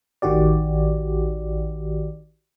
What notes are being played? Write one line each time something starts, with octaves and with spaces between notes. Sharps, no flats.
A1 D#3 F#4 G4 D5